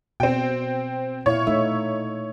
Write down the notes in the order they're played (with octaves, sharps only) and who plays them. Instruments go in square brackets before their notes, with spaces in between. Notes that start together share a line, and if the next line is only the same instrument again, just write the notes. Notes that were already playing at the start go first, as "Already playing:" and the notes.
[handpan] B2 [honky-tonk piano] C4 G5
[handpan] A#2 E4 F5 [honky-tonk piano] C#5
[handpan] A3 D#4 E5